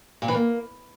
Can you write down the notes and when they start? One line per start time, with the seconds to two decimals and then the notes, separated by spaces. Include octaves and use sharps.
0.22 A#2
0.28 E3
0.34 A#3